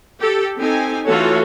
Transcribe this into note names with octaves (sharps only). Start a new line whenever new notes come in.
G4 A4
C4 D#4 G4 A4 G#5
E3 A3 F4 F#4 A4 C#5